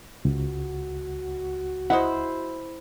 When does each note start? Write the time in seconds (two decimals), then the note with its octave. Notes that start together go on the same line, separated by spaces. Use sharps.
0.25 C#2 F#4
1.90 E4 C5 D#5 F#5